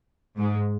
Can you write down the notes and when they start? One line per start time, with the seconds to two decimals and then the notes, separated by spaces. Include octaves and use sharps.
0.37 G#2 G#3